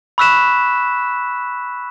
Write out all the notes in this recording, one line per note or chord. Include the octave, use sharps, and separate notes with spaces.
B5 C#6 E6 F#6 B6 E7